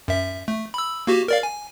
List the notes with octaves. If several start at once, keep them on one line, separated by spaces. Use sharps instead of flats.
F#2 E5
A3
B5 E6
A#3 F#4 G4
A#4 D5 F5
G#5